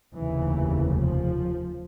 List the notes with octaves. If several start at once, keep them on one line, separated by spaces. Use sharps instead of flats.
F1 D#2 C#3 E3
F3